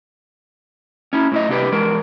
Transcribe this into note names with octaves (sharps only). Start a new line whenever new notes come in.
C#4 E4
A2 E4 D#5
C3 D4 G4 B4
E2 G#3 A#4